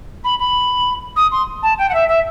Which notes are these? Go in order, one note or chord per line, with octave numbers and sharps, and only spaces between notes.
B5
B5
D#6
C6
A5
G5
F#5
E5
E5